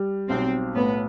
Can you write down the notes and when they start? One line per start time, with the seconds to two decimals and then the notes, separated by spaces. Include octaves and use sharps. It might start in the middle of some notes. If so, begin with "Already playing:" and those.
Already playing: G3
0.29 B1 C4
0.75 A2 B3